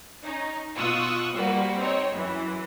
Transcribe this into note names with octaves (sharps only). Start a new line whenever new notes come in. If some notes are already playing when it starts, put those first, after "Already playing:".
C#4 D#4
B2 F4 C#6 D#6 E6 F#6
G3 A#3 F#4 B4 C5
C4 D#4 C#5
F#2 E3